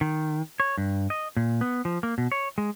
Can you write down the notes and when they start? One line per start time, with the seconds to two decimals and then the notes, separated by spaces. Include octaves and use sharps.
0.01 D#3
0.60 C#5
0.78 G2
1.10 D#5
1.37 A#2
1.61 B3
1.85 F3
2.03 A#3
2.18 B2
2.32 C#5
2.58 G#3